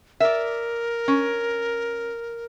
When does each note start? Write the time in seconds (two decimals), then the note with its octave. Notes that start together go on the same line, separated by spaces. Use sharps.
0.20 A#4 D5 E5
1.08 C#4